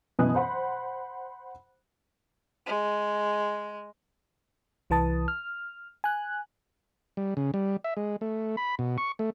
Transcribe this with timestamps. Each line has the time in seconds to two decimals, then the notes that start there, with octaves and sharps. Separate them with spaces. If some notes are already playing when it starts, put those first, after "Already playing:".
0.19 F#2 B2 E3 G#5 D#6 F#6
0.35 C5 F#5 B5 C6
2.67 G#3
4.90 C2 E3 B4 A5 D#6
5.28 F6
6.04 G#5 F#6
7.17 G3
7.37 C#3
7.54 G3
7.84 E5
7.97 G#3
8.21 A3
8.57 B5
8.79 B2
8.98 C#6
9.19 A3